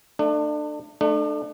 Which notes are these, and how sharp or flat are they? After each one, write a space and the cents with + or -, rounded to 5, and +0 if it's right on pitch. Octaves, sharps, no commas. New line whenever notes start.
A3 +20 D4 +35
A3 +0 D4 +40